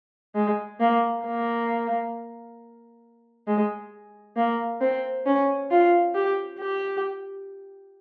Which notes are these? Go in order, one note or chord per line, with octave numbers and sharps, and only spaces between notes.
G#3
A#3
A#3
G#3
A#3
C4
C#4
F4
G4
G4